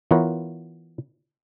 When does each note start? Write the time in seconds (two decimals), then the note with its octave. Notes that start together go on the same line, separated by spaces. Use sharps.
0.11 E3 B3 F4 A#4 B4 C#5